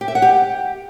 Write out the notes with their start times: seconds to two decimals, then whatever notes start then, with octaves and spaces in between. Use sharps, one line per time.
0.01 G4
0.08 E5
0.15 F#5
0.22 G4